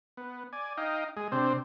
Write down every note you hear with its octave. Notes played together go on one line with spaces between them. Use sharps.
B3
D5 G#5
D#4 D#5 F5 G5
G#3 G#4
C3 C4 D4 C5